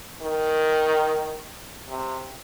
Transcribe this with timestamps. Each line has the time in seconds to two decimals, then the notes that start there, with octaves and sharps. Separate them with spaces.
0.22 D#3
1.89 C3